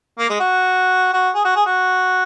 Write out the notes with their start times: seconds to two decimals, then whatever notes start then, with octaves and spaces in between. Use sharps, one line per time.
0.19 A#3
0.30 G#3
0.40 F#4
1.13 F#4
1.35 G#4
1.45 F#4
1.56 G#4
1.66 F#4